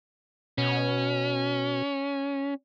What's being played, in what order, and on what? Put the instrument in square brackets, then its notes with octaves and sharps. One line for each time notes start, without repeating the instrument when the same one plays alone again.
[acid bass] B2 [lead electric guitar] C#4